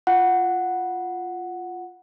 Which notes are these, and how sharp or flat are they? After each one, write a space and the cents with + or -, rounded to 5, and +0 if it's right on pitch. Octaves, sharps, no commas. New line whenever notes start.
F4 +0 F#5 +0